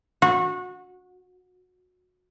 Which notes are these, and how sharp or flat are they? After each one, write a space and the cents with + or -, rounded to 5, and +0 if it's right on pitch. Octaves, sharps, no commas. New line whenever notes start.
F#4 -25